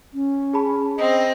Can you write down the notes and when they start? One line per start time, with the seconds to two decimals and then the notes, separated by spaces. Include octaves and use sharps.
0.13 C#4
0.53 G#4 A5 B5
0.98 C4 D#5